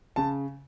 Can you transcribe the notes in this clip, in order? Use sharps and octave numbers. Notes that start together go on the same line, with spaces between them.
C#3 A5